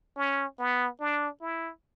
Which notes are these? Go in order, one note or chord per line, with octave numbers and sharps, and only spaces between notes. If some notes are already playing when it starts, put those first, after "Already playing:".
C#4
B3
D4
E4